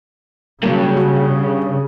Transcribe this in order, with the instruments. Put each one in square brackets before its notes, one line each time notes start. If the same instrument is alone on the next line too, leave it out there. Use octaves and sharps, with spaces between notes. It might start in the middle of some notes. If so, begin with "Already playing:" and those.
[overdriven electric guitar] G2 [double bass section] C#3 [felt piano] F#3 A#3
[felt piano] F#4